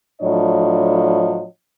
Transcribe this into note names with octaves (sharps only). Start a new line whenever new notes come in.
A2 F3 F#3 D4 C#5 D#5